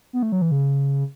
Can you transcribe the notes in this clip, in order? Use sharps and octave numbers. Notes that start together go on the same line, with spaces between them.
B3
A3
F#3
E3
C#3